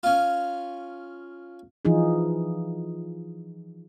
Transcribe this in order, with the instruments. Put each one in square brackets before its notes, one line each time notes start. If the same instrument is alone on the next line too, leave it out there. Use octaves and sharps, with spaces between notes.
[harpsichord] C#4 F4
[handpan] E3 F3 D#4 F4 G#4